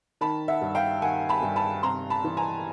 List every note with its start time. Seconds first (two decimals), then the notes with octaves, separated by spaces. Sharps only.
0.21 D#3 A5 B5
0.48 E5 F#5
0.61 G2
0.75 F5 G5
1.02 D#3 F#5 G#5
1.29 A5 B5
1.42 G2
1.56 A5 B5
1.83 C3 A#5 C6
2.10 A5 B5
2.24 E3
2.37 G#5 A#5